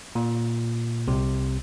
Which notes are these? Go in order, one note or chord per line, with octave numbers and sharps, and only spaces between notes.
A#2
C2 C3